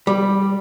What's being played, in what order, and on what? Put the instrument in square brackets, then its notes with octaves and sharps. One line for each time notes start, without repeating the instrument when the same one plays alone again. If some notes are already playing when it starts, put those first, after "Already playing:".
[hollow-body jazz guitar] G3